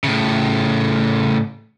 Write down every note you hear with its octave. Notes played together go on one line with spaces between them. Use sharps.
A2 C#3